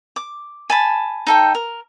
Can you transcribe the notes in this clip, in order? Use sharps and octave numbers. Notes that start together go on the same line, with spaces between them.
D6
G#5 A5 B5
D#4 A4 G5
A#4